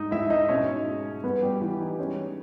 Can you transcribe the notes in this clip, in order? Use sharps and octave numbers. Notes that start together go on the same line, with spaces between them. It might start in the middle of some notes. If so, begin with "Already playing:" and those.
Already playing: G#2 D#4 D#5
G#2 E4 E5
D#4 D#5
B2 C#4 C#5
G#3
G2 B3 B4
G3 G4
E3 E4
D#4
G#3 C#4